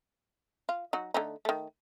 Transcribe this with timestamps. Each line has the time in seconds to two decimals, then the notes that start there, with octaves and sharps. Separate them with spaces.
0.69 F4
0.93 F#3 D#4 F#4
1.14 D3 A3 D#4
1.45 D#3 A3